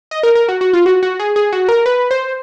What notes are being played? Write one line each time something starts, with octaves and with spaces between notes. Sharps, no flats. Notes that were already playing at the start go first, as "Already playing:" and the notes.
D#5
A#4
A#4
F#4
F#4
F4
F#4
F#4
G#4
G#4
F#4
A#4
B4
C5